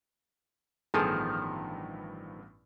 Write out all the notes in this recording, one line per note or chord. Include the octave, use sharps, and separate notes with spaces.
A1 G2 D#3 F3 B3 G#4 A4